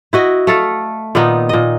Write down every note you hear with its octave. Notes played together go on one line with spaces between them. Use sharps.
E4 F#4 D#5
A3 A4 F5
A#2 D#3 B3 D#4
A#2 D#5